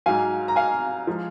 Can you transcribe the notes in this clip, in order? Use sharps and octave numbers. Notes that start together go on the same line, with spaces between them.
G#2 F#3 F5 G#5
A#5
F5 G#5
F3 G#3